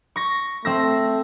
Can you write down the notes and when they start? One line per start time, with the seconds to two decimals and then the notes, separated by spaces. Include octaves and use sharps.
0.16 C#6 A#6
0.65 A3 C4 E6 A#6